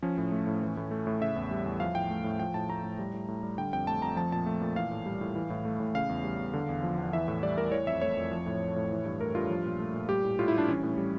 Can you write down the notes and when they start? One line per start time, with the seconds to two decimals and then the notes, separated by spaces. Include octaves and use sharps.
0.02 F3 C#4
0.18 A2
0.32 A3
0.47 A2
0.62 E3
0.77 A2
0.91 A3
1.07 A2
1.21 C#3 E5
1.36 E2
1.51 G3
1.66 E2
1.80 F3 F5
1.95 A2 G5
2.10 A3
2.24 A2
2.39 F3 G5
2.54 A2 A5
2.69 A3 A#5
2.84 A2
2.99 G3
3.13 A2
3.28 A2
3.43 G3
3.58 D3 G5
3.73 F2 G5
3.87 A3 A5
4.02 F2 A#5
4.16 F3 A5
4.32 A#2 A5
4.46 A3
4.61 A#2
4.76 E3 F5
4.91 A2
5.06 G3
5.21 A2
5.35 E3
5.50 A2
5.65 A3
5.80 A2
5.95 C#3 F5
6.09 E2
6.24 G3
6.39 E2
6.54 D3
6.69 E2
6.83 F3
6.98 E2
7.13 E3 E5
7.28 A2
7.43 G3 D5
7.58 A2 A#4
7.72 E3 C#5
7.87 F2 E5
8.01 A3 C#5
8.17 F2
8.31 F3
8.46 A2
8.61 A3
8.76 A2
8.91 E3
9.05 G2
9.20 A3 A#4
9.35 G2 F4
9.50 F3
9.65 A#2
9.80 A3
9.94 A#2
10.09 G3 G4
10.24 A2
10.39 A2 F4
10.48 E4
10.53 G3 D4
10.68 E3 C#4
10.83 A2
10.97 G3